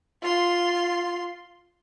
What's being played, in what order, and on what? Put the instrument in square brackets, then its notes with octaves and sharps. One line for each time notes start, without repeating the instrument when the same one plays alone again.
[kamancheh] F4 C6